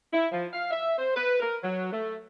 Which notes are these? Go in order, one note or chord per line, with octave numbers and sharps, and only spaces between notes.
E4
F3
F5
E5
C5
B4
A#4
F#3
A3